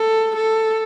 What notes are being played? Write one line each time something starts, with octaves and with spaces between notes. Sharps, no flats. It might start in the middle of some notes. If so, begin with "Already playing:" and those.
Already playing: A4
A4